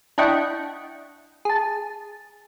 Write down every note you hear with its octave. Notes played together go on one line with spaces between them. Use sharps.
D4 E4 D#5 F#5 G5 C#6
G#4 A5